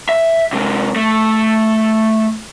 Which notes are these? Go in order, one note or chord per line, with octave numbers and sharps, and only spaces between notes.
E5
C3 G#3
A3